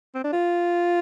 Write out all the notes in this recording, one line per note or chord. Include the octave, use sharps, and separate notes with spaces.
C4
D4
F4